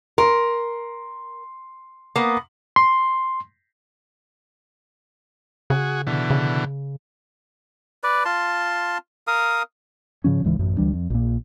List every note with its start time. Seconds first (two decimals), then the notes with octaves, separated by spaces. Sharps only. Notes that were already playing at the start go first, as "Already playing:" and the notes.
0.18 A#4 C6
2.16 A#3 B3
2.76 C6
5.70 C#3 F#4 G#4
6.07 B2 D3 E3
6.30 C#3
8.04 B4 D5
8.25 F4 A5 C6
9.27 A#4 F5 D#6
10.24 G#2 C#3 F3 C#4
10.44 D1 C#2 G#2 E3
10.59 A1 F#2
10.77 D2 E3 G3 D4
10.93 F2
11.10 A#1 A#2